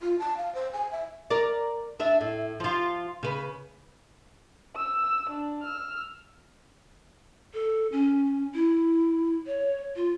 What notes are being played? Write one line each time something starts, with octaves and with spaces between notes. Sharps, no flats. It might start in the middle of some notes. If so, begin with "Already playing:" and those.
F4
A5
F5
C5
G#5
E5
A#4 D5
D4 E5
A2
F3 F4
C#3 B4
E6
D4
E6 F6
A4
C#4
E4
C#5
F4